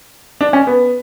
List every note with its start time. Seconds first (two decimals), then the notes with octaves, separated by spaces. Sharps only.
0.41 D4
0.53 C#4
0.67 B3